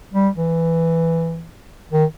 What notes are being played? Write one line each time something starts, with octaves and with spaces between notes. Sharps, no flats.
G3
E3
D#3